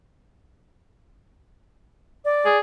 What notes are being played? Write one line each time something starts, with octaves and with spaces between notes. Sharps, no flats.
D5
G#4